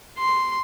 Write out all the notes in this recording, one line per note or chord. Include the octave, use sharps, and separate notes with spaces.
C6